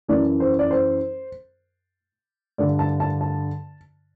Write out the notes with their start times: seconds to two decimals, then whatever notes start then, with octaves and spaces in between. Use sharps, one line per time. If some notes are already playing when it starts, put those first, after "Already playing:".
0.08 F#2 E3 D5
0.40 C5
0.59 D5
0.71 C5
2.58 G2 D3 D5
2.79 A5
3.00 A5
3.21 A5